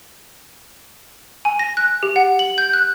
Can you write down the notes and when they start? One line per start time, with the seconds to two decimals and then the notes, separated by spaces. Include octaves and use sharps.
1.45 G#5
1.59 A#6
1.77 F#6
2.03 G4
2.16 F#5
2.39 F#7
2.58 G6
2.73 F#6